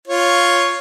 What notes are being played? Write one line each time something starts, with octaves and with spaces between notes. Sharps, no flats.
F4 C#5